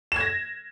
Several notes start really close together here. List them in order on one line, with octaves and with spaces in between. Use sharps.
E7 G#6 A#6